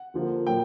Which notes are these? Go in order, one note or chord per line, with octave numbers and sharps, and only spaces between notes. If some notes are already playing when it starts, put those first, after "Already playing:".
Already playing: F#5
D3 F3 A#3
A#2 F#3 A#3 G5